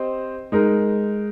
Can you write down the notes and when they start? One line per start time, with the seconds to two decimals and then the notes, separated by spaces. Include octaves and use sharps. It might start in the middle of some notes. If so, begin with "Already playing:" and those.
Already playing: C4 G4 C5 D#5
0.52 G#3 D#4 A#4